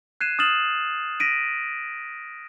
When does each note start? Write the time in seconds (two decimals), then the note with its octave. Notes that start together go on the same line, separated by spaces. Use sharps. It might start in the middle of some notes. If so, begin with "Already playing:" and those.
0.21 F#6 G#6 C7 D#7 E7
0.39 D#6 F6 A6 E7 F#7
1.20 A#6 B6 D7 D#7